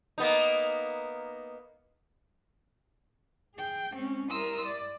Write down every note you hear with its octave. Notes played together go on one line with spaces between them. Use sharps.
A#3 B3 D#4
G#4 G5
G#3 C4 C#4
G3 E4 A#4 C6 D#6 E6
D5